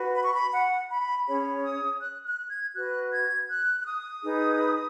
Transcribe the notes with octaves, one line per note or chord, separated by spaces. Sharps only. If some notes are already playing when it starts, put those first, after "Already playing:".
Already playing: F#4 B4
B5
C#6
B5
F#5
B5
C#4 G#4 C#5 B5
D#6
F#6
F#6
G#6
F#4 B4 F#6
G#6
F#6
F#6
D#6
D#4 G#4 B4